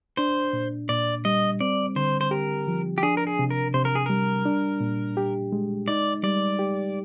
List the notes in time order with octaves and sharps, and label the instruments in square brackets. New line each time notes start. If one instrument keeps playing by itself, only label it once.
[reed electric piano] D4 [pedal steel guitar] C5
[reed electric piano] A#2
[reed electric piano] A#2 [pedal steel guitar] D5
[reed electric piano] G3 [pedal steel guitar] D#5
[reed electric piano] C4 [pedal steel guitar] D5
[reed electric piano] D3 [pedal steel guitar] C5
[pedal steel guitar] C5
[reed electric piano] G4 [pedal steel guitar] A#4
[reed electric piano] F3
[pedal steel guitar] G4
[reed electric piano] D4 [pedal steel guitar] G#4
[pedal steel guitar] A#4
G#4
[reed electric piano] C3
[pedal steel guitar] A#4
[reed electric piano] C3 [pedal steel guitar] C5
[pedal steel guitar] A#4
G#4
[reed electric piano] G3 [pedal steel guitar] A#4
[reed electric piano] D4
A#2
G4
G#3
[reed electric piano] D#4 [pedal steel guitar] D5
[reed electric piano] G3 [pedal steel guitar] D5
[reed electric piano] G4